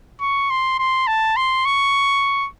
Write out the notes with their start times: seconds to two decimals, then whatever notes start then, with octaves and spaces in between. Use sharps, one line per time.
0.21 C#6
0.50 C6
0.79 C6
1.07 A5
1.36 C6
1.65 C#6